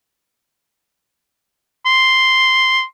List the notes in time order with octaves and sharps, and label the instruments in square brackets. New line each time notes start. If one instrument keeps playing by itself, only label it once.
[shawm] C6